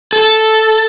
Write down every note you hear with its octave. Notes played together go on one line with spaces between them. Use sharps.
A4